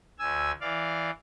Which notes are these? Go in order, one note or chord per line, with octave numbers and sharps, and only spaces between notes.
D2 G#5 E6
E3 D5 F5